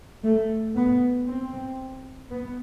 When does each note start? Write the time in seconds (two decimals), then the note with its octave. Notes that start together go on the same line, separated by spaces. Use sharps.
0.24 A3
0.76 B3
1.26 C4
2.29 B3